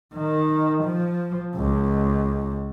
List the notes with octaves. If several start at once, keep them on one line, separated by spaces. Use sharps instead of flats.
D#3
F3
C#2